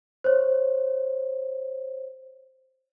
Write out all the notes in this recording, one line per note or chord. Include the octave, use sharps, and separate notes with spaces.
C5 C#5